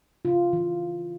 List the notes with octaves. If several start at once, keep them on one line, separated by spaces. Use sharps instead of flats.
C#3 F4
E3